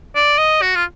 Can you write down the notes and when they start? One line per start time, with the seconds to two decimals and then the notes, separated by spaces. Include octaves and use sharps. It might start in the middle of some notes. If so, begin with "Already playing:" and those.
0.15 D5
0.38 D#5
0.62 F#4
0.75 F4